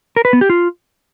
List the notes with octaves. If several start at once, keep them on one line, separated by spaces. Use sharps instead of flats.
A#4
B4
B3
G4
F4